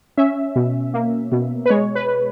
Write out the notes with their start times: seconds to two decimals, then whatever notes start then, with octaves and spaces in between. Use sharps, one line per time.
0.17 C#4 E5
0.56 B2
0.94 A#3
1.32 B2
1.66 B4
1.70 G#3 C#5
1.95 B4